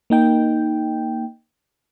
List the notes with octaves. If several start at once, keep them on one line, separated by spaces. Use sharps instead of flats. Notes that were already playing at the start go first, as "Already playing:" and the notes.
A#3 D#4 G5